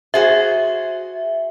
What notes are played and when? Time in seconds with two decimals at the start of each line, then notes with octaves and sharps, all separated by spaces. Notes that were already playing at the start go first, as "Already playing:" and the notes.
0.14 F#4 G#4 C5 E5